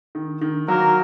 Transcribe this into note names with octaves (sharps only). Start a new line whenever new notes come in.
D#3
D#3
F#3 A#3 A#4